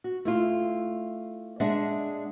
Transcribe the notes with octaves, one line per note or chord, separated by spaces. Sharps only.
F#4
A3 E4 F4
G#3 D4 G#4 D5 E5 F#5